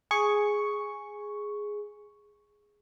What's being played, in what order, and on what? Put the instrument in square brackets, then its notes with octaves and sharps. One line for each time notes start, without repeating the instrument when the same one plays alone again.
[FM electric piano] G#4 C#6